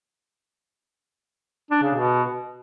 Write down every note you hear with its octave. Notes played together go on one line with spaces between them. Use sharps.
D4
C#3
B2